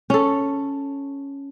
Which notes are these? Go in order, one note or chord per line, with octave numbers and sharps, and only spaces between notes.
C#4 A4